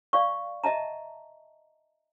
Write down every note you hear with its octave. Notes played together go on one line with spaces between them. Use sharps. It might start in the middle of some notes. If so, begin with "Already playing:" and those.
D5 F5 C#6
D#5 E5 A5 A#5